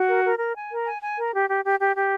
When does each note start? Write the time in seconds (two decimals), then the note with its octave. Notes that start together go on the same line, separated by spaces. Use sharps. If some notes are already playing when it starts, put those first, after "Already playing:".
Already playing: F#4
0.09 A#4
0.25 A#4
0.40 A#4
0.56 G#5
0.71 A#4
0.87 G#5
1.02 G#5
1.17 A#4
1.33 G4
1.48 G4
1.64 G4
1.80 G4
1.95 G4